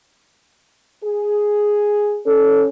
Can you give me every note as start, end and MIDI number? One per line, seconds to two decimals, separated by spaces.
1.04 2.20 68
2.26 2.69 61
2.26 2.65 69